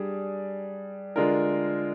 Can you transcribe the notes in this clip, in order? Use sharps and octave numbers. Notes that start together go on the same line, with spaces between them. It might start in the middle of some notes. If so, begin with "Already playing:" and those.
Already playing: G3 D4 G#4
D3 G#3 D4 F4 A#4